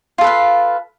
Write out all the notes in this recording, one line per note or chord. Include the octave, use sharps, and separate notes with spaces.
F4 A4 B4 F5